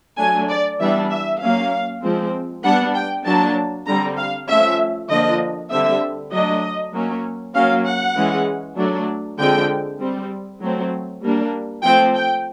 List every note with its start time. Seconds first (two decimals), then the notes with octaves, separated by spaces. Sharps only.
0.18 F#3 A3 D4 G#5
0.49 D5
0.80 E3 G3 B3 D4 E5
1.11 E5
1.41 F#3 A#3 C#4 F5
2.03 F3 G#3 C4
2.64 G3 B3 D4 F#5
2.95 G5
3.25 F#3 A#3 D4 A5
3.87 D3 G3 C4 A#5
4.17 F5
4.48 F3 A3 C#4 E5
5.09 D3 F3 A#3 D4 D#5
5.71 D3 G3 C4 E5
6.32 F#3 A3 D4 D#5
6.93 F#3 A#3 C#4
7.55 F#3 A#3 C#4 F5
7.85 F#5
8.16 E3 G#3 C#4
8.77 F#3 A3 D4
9.39 D3 F3 G#3 C4 G5
10.00 G3 C4
10.61 F#3 A3 C4
11.23 G3 A#3 D4
11.84 F3 A3 C4 G5
12.14 G5